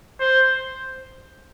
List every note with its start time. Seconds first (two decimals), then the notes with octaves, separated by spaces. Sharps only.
0.20 C5